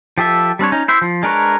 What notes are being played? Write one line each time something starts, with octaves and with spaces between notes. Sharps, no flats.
F3 G4 A4 E5
G3 C4 D4 C#5
C#4 D#4
E4 C5 E5
F3
G#3 D4 A#4 B4 C#5